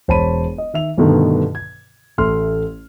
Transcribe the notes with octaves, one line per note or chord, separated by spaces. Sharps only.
E1 C5 C#5 A5 B5 D#7
D#5
D#3 E5 F7
G2 B2 D3 D#3 A3
G#6
A1 A3 C6 F6